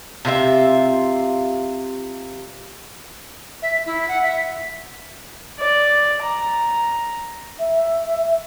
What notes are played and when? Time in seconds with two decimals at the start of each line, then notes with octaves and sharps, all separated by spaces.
0.25 C3 F4 G4 E5
3.62 E5
3.86 E4
4.08 F#5
4.23 E5
5.59 D5
6.21 A#5
7.59 E5